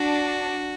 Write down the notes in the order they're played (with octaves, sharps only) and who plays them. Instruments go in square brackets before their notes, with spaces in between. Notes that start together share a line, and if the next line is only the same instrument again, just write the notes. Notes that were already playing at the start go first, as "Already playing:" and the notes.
Already playing: [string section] D4 [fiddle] F#4